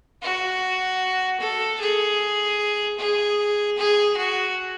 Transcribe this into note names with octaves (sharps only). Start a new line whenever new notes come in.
F#4
A4
G#4
G#4
G#4
F#4